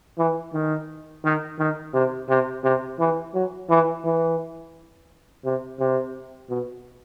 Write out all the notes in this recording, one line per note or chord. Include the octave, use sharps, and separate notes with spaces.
E3
D#3
D#3
D#3
C3
C3
C3
E3
F#3
E3
E3
C3
C3
B2